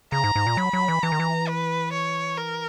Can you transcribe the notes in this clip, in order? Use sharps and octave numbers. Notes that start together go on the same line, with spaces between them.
C#3 A#5
G#2
G#2
A#2
F#3 B5
F#3
E3
E3 A#5
D#3
E3
B4
C#5
A#4